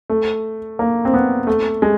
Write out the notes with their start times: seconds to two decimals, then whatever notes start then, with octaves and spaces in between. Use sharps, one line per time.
0.10 A3
0.79 A#3
1.05 C4
1.14 B3
1.47 A3
1.82 G#3